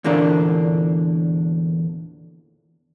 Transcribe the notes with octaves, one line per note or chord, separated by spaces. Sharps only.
E2 A#2 D3 A#3 D4